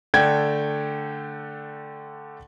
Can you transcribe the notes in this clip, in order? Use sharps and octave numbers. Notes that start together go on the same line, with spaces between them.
D3 A3 G5 G#6